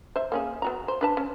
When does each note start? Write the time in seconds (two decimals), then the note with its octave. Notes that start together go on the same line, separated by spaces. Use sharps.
0.16 C5 E5
0.32 A#3 C#4 G#4
0.62 B3 F#4 A#5
0.88 C5
1.01 D4 B4 A5
1.17 C#4